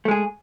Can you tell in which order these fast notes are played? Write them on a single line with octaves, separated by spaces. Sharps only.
A3 G#3 G#4